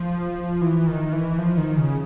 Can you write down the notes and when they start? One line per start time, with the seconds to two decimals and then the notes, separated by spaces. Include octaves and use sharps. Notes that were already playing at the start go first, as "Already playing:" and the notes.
Already playing: F3
0.61 E3
0.87 D#3
1.12 E3
1.38 F3
1.57 D#3
1.77 C#3